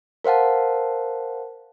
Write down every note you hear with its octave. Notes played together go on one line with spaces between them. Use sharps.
A#4 C5 F5 F#5 A5